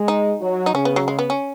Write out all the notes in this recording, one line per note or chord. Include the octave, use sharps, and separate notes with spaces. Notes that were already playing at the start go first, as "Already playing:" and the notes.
Already playing: G#3
D#4
F#3
D#4
C#3 C#4
B3
F#3
G#3
B3
C#4